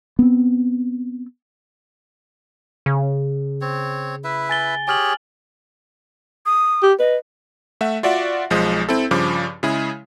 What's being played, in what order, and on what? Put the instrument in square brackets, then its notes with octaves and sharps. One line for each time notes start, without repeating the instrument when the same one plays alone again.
[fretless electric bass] B3 C4
[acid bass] C#3
[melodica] C4 C#5
E4 B4 E5
[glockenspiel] G#5 A6 G7
[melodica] G4 G#4 C#5 [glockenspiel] G#5 F6 F#7
[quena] D#6
[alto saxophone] G4
[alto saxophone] B4 [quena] D#5
[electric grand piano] A3 E5 F#5
F4 F#4 D5 E5 F#5
B1 F3 G#3 D#6
C4 E4 A4
G2 C#3 F3 D6
C#3 G#3 E4 G#4